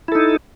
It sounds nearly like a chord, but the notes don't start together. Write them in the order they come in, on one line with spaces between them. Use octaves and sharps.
E4 A4 D#4